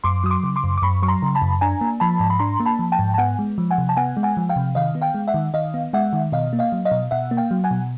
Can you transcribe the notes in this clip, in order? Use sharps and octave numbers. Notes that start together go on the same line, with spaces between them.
F#2 C6 D6
F#3 D#6
C6 D6
C#3
C6 D6
F#2
D6
F#2 B5 C#6
F#3 C#6
A#5 C6
C#3
A5 B5
F#2
D4 G#5 A#5
A#3
F3 A5 B5
G#2
B5
D4 A#5 C6
A#3
A5 B5
F3
G5 A5
G#2
A5
B3 F#5 G#5
G#3
F3
F#5 G#5
C3
A5
B3 F#5 G#5
G#3
F#5 G#5
F3
F5 G5
C3
D#3 D#5 F5
B3
F5 G5
G#3
E5 F#5
D#3
D#3 D#5 F5
B3
G#3 E5 F#5
D#3
B2 D#5 F5
A#3
D#5 F5
F#3
D#5 F5
B2
B2 E5 F#5
A#3
F5 G5
F#3
F#5 G#5
B2